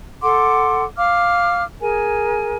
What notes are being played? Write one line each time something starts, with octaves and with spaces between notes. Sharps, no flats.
A4 F#5 C6 D6
F5 D6 F6
G#4 A#4 G#5